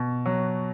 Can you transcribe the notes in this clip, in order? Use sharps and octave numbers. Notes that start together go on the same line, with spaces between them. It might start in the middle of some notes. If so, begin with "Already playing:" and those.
Already playing: B2
F#3